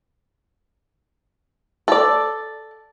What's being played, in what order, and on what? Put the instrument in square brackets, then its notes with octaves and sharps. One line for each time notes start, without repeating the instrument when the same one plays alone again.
[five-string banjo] A4 D5